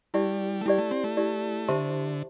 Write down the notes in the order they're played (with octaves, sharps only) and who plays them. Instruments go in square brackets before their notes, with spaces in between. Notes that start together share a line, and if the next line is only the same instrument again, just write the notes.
[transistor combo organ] G3 [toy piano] E4 G4 D5
[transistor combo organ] A3
[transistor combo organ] G3 [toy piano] E4 G4 D5
[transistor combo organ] A3
C4
A3
[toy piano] E4 G4 D5
[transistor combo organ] D3 [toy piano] G4 C5 E5 A5 C6